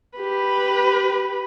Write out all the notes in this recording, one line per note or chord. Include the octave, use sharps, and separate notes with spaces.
G4 B4